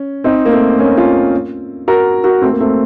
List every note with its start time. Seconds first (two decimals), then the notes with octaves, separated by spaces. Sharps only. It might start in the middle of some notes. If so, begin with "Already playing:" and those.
Already playing: C#4
0.24 C4 D#4
0.45 A#3
0.52 A3 C4
0.79 A#3 C#4
0.97 C#4 F4
1.88 F#4 A#4
2.24 F#4 A#4
2.42 A3 C4
2.52 A#3
2.60 A3 C4